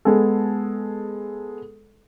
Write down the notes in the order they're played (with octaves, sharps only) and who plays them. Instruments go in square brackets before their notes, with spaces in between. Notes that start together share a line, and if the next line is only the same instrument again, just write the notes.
[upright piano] G#3 B3 G#4 A4